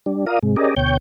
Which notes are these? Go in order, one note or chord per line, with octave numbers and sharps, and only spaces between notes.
G3 D4
F4 A#4 D5 F5 D#6
G#2 C3 G#3
C#4 G4 G#4 A#4 D5 D#5
D2 B2 C#5 G5 G6